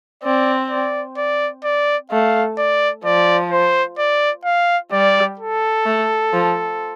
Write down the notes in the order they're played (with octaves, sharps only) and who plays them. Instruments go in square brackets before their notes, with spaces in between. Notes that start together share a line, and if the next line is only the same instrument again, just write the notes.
[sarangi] C4 [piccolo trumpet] D5
[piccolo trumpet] D5
D5
D5
[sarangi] A3 [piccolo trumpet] F5
[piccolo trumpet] D5
[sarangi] F3 [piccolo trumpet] D5
[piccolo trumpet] C5
D5
F5
[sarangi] G3 [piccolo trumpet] D5
[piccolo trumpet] A4
[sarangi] A3
F3